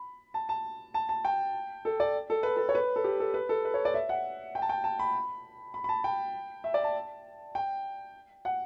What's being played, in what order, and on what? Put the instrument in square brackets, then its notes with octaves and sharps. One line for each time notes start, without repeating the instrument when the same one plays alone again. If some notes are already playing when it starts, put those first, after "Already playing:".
Already playing: [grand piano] B5
A5
A5
A5
A5
G5
A4
D5
A4
B4
A4
C#5
B4
A4
G4
A4
B4
A4
B4
C#5
D5
E5
F#5
G5
A5
G5
A5
B5
B5
B5
A5
G5
E5
D5
A5
G5
F#5